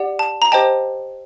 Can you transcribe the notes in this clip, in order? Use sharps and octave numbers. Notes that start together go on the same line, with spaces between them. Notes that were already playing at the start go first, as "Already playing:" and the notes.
Already playing: G4 D5 F#5
A5
A#5
G4 C5 D#5 G5 A5